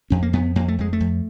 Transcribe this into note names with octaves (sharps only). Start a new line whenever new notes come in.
F2 C#4
A#3
F2 B3
F2 A#3
A3
F2 G#3
A3
F2